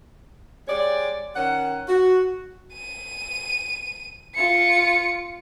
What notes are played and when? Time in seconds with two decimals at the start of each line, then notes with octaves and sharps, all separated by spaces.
0.68 G#3 G4 C#5 D5
1.35 D#3 C#4 F#5
1.89 F#4
2.73 D#7
4.35 F4 C#7